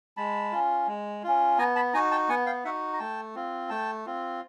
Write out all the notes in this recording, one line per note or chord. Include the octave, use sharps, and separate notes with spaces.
G#3 A5 B5
C#4 F4
G#3
C#4 F4
B3 G#5 A#5
A5 B5
D#4 F#4 G#5 A#5
G5 A5
B3 F#5 G#5
F5 G5
D#4 F#4 E5 F#5
A#5
A3 G5 A5
C4 F4
A3 G5 A5
C4 F4